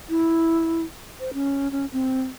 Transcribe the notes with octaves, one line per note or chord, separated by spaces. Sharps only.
E4
C5
C#4
C#4
C4